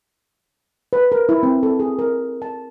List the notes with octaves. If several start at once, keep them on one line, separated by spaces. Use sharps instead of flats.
B4
A#4
E4
C4
A4
G#4
A#4
A5